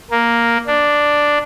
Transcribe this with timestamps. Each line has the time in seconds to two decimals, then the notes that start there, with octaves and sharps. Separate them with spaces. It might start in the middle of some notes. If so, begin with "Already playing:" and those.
0.11 A#3
0.67 D4